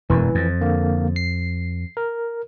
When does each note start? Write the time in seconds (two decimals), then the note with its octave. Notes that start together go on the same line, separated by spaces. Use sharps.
0.10 E1 F#2 E3
0.35 F2
0.61 D3 A#3
1.16 C7
1.97 A#4